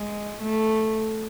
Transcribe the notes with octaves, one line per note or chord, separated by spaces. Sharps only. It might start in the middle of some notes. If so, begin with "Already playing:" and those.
Already playing: G#3
A3